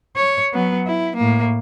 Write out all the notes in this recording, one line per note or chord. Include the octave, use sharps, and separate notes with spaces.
C#5
F#3 B3
E4
A2 A#3